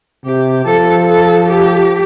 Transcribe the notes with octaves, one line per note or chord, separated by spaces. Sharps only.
C3 G4
F3 A4
A4
G4